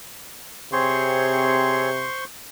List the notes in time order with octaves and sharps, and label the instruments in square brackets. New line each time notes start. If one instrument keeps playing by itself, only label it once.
[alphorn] C3 [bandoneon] C4 G#4 C#5 [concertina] C5 C6 C#6